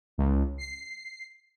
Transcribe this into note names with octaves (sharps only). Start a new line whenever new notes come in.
C#2
C7